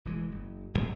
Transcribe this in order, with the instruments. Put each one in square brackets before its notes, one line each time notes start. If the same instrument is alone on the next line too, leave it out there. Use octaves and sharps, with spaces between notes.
[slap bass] E1 E3 G#3
F#1
D1 G1